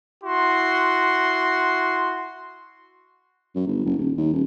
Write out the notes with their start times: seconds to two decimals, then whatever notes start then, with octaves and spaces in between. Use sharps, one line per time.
0.23 E4 F#4 C6
3.55 F#2
3.67 G1
3.85 F#1
3.99 D#1
4.18 D#2
4.33 D#1